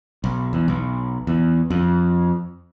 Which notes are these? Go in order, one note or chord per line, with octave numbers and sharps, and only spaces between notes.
B1
E2
B1
E2
F2